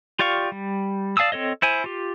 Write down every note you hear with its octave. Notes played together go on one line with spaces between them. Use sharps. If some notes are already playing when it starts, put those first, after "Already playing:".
F4 G4 D5 F5 C#6
G3
D5 F5 A5 D#6 E6
C4 A4 C#5 D#5
E4 C5 G#5
F4 G4